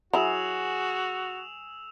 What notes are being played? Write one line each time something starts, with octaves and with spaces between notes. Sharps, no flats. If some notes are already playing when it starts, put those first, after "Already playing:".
F#3 E4 F#4 G#4 E6 E7 F7